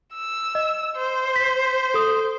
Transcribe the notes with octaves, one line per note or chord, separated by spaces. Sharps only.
E6
D#5
C5
B6
A4 D#6